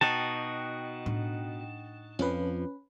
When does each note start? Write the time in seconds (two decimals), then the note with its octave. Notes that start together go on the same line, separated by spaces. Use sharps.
0.01 B2 D#4 F#4 G5 A5
1.06 A2 D4
2.19 F2 F3 C#4 B4